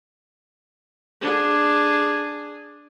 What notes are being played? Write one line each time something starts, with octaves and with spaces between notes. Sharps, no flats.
D4 G#4